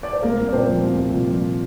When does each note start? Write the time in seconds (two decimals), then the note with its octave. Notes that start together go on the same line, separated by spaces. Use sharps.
0.03 D5
0.13 C5
0.22 C2 A#3 A#4
0.37 C2
0.48 D5
0.53 A#2 C4 C5
0.68 F3
0.84 C2
0.99 C2
1.13 A#2
1.29 F3